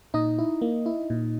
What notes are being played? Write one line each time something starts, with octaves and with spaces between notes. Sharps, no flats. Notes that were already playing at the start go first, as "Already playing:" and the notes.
A#2 D#4 D#5
E4
A#3
E4
A#2